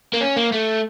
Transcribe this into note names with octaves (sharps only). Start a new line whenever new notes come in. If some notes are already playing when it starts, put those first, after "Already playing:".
A#3
C#4
A#3
A3